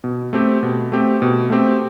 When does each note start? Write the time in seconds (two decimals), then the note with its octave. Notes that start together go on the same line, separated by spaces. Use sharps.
0.04 B2
0.33 A3 C4 G4
0.63 B2
0.92 A3 C4 G4
1.22 B2
1.50 A3 C4 G4